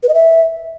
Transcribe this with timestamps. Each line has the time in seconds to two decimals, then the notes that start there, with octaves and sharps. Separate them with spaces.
0.03 B4
0.09 D#5
0.14 E5